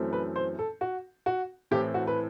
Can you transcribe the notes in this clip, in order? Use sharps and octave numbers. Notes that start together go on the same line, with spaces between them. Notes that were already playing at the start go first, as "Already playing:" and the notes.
Already playing: F#2 E3 A3 C4
B4
C5
A4
F#4
F#4
A2 E3 A3 C4 G4
F#4
B4